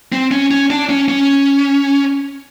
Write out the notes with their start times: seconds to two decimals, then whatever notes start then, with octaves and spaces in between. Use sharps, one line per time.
0.12 C4
0.31 C#4
0.51 C#4
0.70 D4
0.89 C#4
1.08 C#4